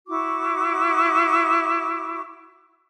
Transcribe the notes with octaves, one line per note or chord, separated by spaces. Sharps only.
E4 F#4 C#6 D6